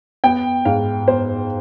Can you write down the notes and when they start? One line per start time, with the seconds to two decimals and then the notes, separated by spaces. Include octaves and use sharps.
0.24 B3 G5
0.65 G#2 F5
1.08 B3 C5